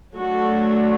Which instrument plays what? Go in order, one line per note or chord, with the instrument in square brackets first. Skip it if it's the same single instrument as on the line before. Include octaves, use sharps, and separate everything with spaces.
[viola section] F#3 A3 D4 F#4 A4